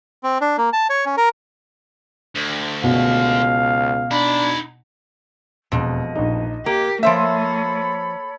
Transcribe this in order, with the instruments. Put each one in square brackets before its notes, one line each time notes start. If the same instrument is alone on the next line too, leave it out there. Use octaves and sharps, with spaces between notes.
[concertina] C4
D4
A#3
A5
C#5
C#4
A#4
[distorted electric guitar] D2
[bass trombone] C#2 [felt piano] B2 [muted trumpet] F5
[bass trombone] D4 [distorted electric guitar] D#4 B5
[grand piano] E1 [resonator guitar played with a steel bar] F2 B2 [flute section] D#5
[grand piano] A#1 D#4
[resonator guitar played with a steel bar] A#3 [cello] G4 [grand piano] A#4
[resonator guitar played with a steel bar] F3 C5 E5 [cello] A#3 [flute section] A4 C#5 B5